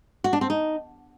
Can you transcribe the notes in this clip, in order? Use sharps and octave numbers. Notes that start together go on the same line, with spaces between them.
F#4
D4
C4
D#4